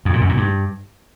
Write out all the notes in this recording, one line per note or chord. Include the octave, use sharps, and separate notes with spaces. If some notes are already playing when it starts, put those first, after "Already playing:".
F2
A#2
F#2
A#2
G2